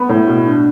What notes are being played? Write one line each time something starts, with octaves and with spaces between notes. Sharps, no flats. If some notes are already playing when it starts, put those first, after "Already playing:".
Already playing: B3 B5
A2
B2
D4